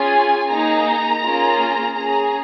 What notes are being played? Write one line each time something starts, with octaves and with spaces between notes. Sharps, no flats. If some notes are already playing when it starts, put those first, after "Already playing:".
Already playing: C#4 F4 G#4 G#5
A#3 D#4 G#4 A#5
A#3 C#4 F4 G#4
C#4 G#4 A#5